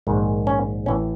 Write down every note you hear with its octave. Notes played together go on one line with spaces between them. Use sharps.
A#1 G#2 D#3
C#4
A1 A2 E3 C#4